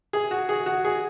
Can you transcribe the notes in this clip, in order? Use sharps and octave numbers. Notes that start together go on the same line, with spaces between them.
G#4
F#4
G#4
F#4
G#4